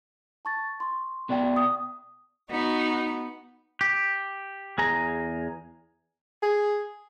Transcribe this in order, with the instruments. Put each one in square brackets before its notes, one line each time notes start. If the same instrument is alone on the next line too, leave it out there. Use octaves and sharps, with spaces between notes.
[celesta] A5 C#6 A6
C6 C#6
[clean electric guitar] B2 D5 G5
[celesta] C#6 D#6
[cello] B3 [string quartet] D#4 F#4
[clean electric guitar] G4
E2 G#4 A#5
[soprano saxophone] G#4